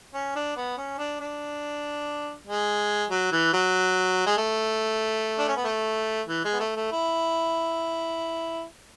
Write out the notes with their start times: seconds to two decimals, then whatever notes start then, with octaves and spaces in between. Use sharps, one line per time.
0.14 C#4
0.36 D4
0.56 B3
0.78 C#4
0.98 D4
1.20 D4
2.47 G#3
3.10 F#3
3.32 E3
3.53 F#3
4.26 G#3
4.37 A3
5.39 D4
5.48 C#4
5.56 B3
5.65 A3
6.28 E3
6.45 G#3
6.53 B3
6.60 A3
6.76 A3
6.92 E4